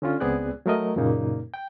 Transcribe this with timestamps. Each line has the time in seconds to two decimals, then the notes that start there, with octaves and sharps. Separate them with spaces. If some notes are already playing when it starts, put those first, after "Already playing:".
0.02 D3 C#4 F4
0.20 C#2 B3 C4 G#4 D5 F#6
0.66 F#3 A3 A#4 D#5
0.96 F#2 A#2 C#3 A#3 D#4
1.54 G5